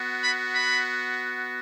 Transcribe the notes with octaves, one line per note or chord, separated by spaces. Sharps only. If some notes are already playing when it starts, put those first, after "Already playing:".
Already playing: B3 F#4
B5
B5